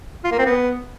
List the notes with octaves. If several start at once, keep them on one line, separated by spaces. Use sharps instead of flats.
F4
A#3
C4
B3